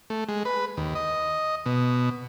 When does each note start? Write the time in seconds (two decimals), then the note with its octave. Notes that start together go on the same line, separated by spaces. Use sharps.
0.10 A3
0.29 G#3
0.45 B4
0.77 D#2
0.95 D#5
1.66 B2